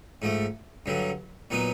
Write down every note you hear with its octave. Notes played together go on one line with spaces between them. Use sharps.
G#2 F3 A3
G2 D3 F#3
A#2 F#3 B3 D#4